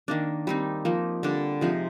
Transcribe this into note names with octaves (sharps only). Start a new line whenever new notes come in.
D#3 A#3 D4
G3 C4 D#4
F3 A#3 D#4
D3 G3 D4
C3 F3 G#3 D#4